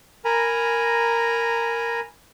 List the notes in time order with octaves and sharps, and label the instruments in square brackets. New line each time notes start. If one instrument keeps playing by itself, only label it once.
[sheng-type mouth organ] A#4 G#5 A#5 B5